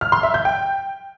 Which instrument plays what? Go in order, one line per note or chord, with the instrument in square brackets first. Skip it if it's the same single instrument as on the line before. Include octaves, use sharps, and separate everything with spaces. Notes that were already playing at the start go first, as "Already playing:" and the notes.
[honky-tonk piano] F6
C6
E5
G6
G5